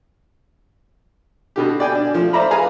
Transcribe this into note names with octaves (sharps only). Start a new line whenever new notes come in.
B2 D3 G4
D5 G5 G#5
D4
F3 A3
C5 D5 E5 A#5 B5
G#4 B4 F5 G#5 A#5